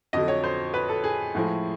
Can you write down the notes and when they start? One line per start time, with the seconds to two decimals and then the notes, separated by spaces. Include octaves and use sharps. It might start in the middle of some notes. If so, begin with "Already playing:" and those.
0.13 F2 D3 F#3 D#5
0.28 C#5
0.44 C5
0.74 B4
0.89 A4
1.04 G#4
1.35 A2 F3 G#3